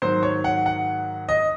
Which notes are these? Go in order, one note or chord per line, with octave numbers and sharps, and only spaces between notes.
G#2 D#3 F#3 C5
C#5
F#5
F#5
D#5